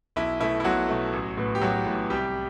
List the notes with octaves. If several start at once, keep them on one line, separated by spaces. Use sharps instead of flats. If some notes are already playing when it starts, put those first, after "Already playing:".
B1 E4
B2 A3 E4
E4
B1 F#3 F#4
B2 A3
A1
A2 E3 B3
G4
A1 F#3 F#4
A2 E3 B3
C2 G3 G4